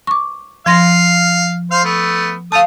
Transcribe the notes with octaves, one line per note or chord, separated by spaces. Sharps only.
C#6 D6
F3 F5 C6 A#6
C5 F5
A3 B3
A3 F5 A5 D#6